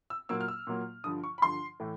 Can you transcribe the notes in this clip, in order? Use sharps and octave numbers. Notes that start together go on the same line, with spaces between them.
E6
A#2 F#3 A#3 E6
F6
E6
A#2 F#3 A#3
G2 D3 F3 D#6
C#6
B5
G2 D3 F3 C6
A2 E3 A3